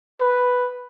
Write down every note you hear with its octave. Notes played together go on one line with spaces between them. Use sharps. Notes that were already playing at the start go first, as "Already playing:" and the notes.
B4